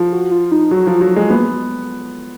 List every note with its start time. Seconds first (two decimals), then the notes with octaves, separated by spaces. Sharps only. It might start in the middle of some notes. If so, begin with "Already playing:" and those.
Already playing: F3
0.12 F#4
0.32 F4
0.52 D#4
0.71 F#3 F#4
0.87 F3 F4
1.01 F#3 F#4
1.16 G#3
1.30 A#3 B3